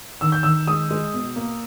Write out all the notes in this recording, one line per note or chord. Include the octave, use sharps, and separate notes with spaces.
D#3 E6
G6
D#3 E6
G#3 D#6
G#3
B2
A#3